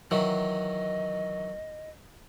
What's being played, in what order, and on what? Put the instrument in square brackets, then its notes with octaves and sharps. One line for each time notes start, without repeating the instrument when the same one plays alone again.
[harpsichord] D#3 E3 F#3 [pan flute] D#5